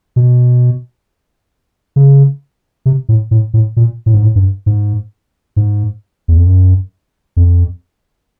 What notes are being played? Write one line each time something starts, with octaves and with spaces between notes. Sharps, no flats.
B2
C#3
C3
A2
A2
A2
A#2
A2
G#2
A2
G2
G#2
G#2
E2
F2
F#2
F2